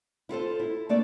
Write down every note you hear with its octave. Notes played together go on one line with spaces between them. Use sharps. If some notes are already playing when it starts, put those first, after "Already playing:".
E4 F4 A4 C5
E4
C3 A3 A#3 D4 E4 D5